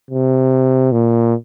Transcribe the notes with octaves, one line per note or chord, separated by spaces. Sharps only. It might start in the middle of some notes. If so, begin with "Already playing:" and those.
C3
A#2